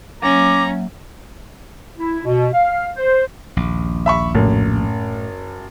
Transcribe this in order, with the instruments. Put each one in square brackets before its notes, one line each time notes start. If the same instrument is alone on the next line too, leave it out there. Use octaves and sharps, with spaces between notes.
[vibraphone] F#3 A#3 E5 [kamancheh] C#4 [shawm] A#5 [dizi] D6
[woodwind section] E4
B2
F5
C5
[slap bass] A#1 D#2
[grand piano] E5 B5 C#6
[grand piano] F#1 [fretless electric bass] A2